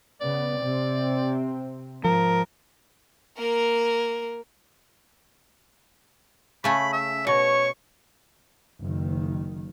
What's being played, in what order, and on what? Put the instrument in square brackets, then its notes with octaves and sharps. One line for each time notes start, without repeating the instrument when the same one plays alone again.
[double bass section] C#3 B3 [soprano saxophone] D5
[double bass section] C3 C4
[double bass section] G#2 [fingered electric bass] F3 [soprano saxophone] A#4
[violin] A#3 A#4
[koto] C#3 A3 C#4 [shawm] B5
[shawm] E5
[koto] B2 [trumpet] C#5 [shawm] C#6
[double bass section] F#1 D#3